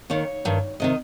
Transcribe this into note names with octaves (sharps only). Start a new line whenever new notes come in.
D#2 D#3 C#5
G2 D#3
C3 D#3 D#5